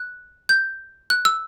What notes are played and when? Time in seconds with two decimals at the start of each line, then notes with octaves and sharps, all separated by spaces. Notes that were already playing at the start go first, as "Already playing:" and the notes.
Already playing: F#6
0.49 G6
1.10 F#6
1.25 E6